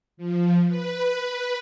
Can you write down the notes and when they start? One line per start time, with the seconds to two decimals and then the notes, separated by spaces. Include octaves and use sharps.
0.17 F3
0.67 B4